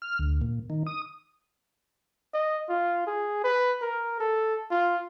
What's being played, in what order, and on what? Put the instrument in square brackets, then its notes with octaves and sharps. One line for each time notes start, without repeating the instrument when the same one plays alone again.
[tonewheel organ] F6
D2
A#2
D#3
D#6
[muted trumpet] D#5
F4
G#4
B4
A#4
A4
F4